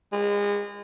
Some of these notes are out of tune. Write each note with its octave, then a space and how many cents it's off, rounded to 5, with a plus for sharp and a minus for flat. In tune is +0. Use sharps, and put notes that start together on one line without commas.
G#3 -30